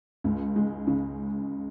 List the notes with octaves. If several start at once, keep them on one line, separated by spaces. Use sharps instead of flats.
C#2
G#3
C#3